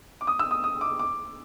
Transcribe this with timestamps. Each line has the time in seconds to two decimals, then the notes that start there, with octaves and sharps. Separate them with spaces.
0.21 D6
0.27 D#6
0.39 E6
0.51 D#6
0.64 D#6
0.81 D6
0.99 D6